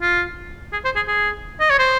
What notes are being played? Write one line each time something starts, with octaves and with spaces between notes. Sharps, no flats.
F4
G#4
C5
G#4
G#4
D#5
C#5
C5